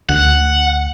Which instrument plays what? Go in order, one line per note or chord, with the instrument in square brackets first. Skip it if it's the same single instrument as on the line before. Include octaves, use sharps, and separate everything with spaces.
[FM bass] D2 [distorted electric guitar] F#5